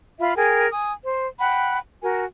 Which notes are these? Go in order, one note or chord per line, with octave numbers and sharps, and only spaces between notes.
F4 E5 F5 B5
G#4 A#4 G5 G#5
G#5 D#6
C5
F#5 G5 B5 F#6
F#4 A#4 G#5